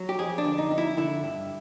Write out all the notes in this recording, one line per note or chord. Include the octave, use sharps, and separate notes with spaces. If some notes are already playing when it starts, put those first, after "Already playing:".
Already playing: F#3
G4
F2 G#4
D4
D3
D#4
F2
E4
D3 E4
G2